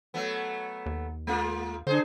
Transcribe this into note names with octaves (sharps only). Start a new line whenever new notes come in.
F#3 A3 B3
D#2
G#3 A#3 F4
D3 D4 G#4 C5